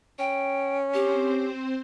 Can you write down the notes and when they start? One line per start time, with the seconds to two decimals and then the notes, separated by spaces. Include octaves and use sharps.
0.19 C#4 G5
0.94 C4 G4 C5